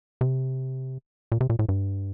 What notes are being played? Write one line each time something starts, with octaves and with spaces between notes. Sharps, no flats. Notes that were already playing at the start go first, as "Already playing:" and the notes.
C3
A#2
C3
A#2
A2
G2